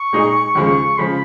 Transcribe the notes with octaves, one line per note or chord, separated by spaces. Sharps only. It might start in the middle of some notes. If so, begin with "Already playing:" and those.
Already playing: C#6
A#2 G#3 D#4 G#4
D#2 C#3 F3 G#3
C#3 F3 G#3 B5